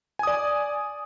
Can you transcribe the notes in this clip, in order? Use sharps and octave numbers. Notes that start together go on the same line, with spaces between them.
D5 G#5 D#6